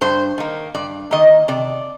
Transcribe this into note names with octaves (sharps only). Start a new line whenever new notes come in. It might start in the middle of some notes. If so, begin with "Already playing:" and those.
G2 C5
D#3 A#3
G2 D5
D#3 A#3 D#5
C3 D5